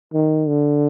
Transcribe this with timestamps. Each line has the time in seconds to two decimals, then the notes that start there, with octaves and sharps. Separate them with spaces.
0.14 D#3
0.48 D3